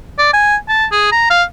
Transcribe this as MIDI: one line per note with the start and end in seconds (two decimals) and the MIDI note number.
0.18 0.30 74
0.33 0.56 80
0.69 0.85 81
0.92 1.07 68
1.12 1.28 82
1.30 1.43 77